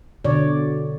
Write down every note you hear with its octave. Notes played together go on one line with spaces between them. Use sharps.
B2 D3 C#5 D5